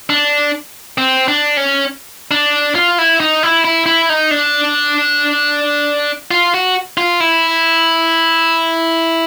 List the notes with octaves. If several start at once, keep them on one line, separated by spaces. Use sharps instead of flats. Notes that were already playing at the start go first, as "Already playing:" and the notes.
D4
C4
D4
C#4
D4
F4
E4
D#4
E4
E4
E4
D#4
D4
F4
F#4
F4
E4